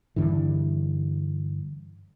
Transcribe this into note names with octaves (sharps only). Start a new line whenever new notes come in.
G2 D3 E3